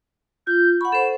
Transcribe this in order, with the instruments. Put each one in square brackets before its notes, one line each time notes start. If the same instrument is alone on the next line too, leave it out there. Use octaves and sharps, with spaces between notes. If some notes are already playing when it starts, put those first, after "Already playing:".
[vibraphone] F4 [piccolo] G6
[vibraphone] F#5 B5 [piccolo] C#6
[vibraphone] A4 C5 [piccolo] E7